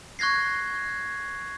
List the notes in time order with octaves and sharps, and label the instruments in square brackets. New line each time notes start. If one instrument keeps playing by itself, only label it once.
[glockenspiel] C#6 F#6 G#6 A#6 C7